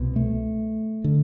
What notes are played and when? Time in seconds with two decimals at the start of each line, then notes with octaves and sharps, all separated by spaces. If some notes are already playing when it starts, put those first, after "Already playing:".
Already playing: C2 B2
0.16 A3
1.04 D3